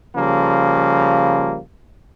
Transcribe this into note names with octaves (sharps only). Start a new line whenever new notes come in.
C#3 F3 G3 A#3